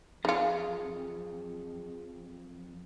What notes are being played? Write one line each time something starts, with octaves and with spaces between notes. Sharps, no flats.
F2 D#4 F4 G#4 C#7